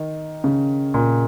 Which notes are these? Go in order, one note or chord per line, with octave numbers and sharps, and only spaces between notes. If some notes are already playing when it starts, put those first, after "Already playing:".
Already playing: D#3
C#3
A#2